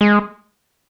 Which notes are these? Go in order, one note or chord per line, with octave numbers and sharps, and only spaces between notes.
G#3